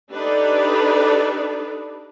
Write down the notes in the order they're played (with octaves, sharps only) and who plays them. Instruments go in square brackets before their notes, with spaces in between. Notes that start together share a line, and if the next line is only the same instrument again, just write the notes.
[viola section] D4 D#4 G4 A4 B4 D5